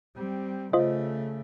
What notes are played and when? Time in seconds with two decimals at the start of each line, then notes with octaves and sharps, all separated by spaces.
0.15 G3 C4
0.73 C#3 A3 F4 C5 D#5